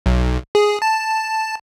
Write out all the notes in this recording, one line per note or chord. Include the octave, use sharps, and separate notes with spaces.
B1
G#4
A5